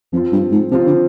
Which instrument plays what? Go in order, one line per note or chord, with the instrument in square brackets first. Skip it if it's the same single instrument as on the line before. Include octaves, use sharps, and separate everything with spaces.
[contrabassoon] F2 [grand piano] F3 C4 F4
[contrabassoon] G2
G#2
[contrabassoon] C3 [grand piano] F3 C4 F4
[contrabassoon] D3